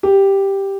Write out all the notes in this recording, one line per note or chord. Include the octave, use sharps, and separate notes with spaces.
G4